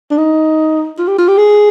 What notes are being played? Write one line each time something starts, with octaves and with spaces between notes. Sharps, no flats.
D4
D#4
F4
G4
F4
G4
G#4